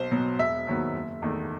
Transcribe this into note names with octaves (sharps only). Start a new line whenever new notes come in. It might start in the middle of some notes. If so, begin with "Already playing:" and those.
Already playing: B1 C5
B2 F#3 B3
E1 E5
D#2 D#3 F#3 B3
F#1
E2 D#3 A3